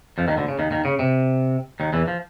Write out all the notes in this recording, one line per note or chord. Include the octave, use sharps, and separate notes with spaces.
F2 F3
D#2 D#3
D2 D3
C#3
D#2 D#3
D#2 D#3
C#3
C3
D#2 D#3
E2 E3
F3